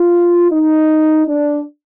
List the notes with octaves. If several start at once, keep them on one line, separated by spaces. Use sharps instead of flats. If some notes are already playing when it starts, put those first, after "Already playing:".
Already playing: F4
D#4
D4